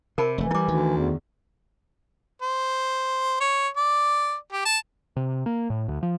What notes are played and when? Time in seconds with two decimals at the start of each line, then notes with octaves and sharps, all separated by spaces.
0.18 C3 A#4 A5 B5
0.38 F1 E3 A3
0.51 G3 A3 E4 D6
0.68 D2 D#3
0.97 E2
2.42 C5
3.41 C#5
3.77 D5
4.52 G4
4.65 A5
5.16 C3
5.46 A#3
5.70 A2
5.88 D2
6.03 F3